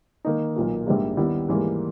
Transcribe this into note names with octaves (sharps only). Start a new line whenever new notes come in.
D#3 A#3 D#4
B1 A#2 A#3
A#1 G#2 G3 A#3
D#2 D#3 G3 B3 E4
G#2 E3 G3 A#3